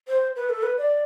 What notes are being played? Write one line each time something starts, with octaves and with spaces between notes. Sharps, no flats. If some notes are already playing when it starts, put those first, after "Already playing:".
C5
B4
A4
B4
D5